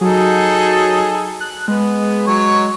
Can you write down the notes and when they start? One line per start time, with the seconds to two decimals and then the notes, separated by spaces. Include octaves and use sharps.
0.01 F#3 D#4 G#4 A4
1.40 F#6
1.68 G#3 B3
2.27 F#3 C#5